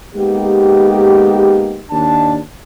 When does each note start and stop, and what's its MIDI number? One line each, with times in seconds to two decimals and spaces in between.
0.15 1.83 56
0.15 1.83 58
0.15 1.83 59
0.15 1.83 63
0.15 1.83 67
1.91 2.38 39
1.91 2.38 62
1.91 2.38 81